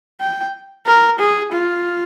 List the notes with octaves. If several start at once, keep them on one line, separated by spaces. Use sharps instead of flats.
G5
A#4
G#4
F4